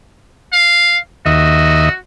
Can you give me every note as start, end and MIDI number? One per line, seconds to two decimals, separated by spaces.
0.53 0.98 77
1.26 1.89 39
1.26 1.97 66
1.26 1.89 75
1.26 1.89 76